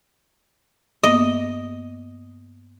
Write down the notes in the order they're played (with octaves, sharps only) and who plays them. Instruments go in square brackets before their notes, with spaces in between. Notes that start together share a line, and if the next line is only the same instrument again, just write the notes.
[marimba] G2 A#3 B3 [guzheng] D#5